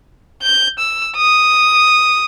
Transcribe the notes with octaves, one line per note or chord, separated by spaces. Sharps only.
G6
E6
D#6